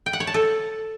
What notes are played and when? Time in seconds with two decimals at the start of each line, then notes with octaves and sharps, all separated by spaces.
0.06 G5
0.13 F#5
0.20 C#5
0.27 A5
0.34 A4